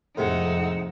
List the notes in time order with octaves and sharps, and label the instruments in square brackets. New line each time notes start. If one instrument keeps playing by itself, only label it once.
[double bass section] F2 [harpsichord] A2 C3 G#3 [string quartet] D#4 E6 [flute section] F#5